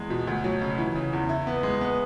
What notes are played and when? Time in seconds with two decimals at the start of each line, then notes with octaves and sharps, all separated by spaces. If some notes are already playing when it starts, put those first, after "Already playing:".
Already playing: E2 G#3
0.10 B2
0.27 D2
0.44 F#3
0.61 C#3
0.78 E3
0.95 C#3
1.13 E2
1.29 E4
1.47 B3
1.63 G#3
1.81 B3